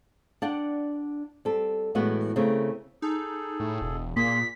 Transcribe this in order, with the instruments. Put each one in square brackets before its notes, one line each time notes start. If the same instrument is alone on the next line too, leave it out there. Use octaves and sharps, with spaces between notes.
[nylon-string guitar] D4 D5 F#5 G5
G3 C4 A4
A2 E3 G#3 B3 F#4
C#3 A3 C4 A#4
[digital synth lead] D#4 [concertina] G#4 A4
[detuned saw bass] A2
E1
[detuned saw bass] A#2 [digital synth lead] A#3 [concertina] G#4 C6 [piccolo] B6